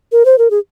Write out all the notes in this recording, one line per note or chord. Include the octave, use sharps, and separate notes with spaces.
A#4
C5
A#4
G#4